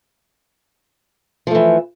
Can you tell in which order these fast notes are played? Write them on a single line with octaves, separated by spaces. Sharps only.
F3 A3 E3